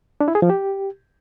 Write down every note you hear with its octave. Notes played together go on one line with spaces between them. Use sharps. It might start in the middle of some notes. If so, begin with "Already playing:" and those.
D4
E4
G#4
F3
G4